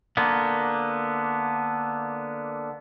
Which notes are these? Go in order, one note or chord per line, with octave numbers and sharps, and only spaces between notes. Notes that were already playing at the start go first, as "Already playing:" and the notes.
D3 A#3 B3